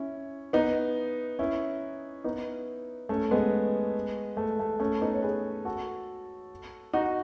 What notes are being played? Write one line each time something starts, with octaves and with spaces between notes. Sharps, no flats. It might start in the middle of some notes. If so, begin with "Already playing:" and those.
Already playing: C#4 E4
B3 D#4
C#4 E4
B3 D#4
A3 C#4
G#3 B3
A3
A3
A3 C#4
B3 D#4
C#5
G#4 B4
F#4 A4
D#4 F#4